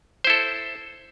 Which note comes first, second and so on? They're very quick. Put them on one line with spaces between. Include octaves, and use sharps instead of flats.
C5 E4 A4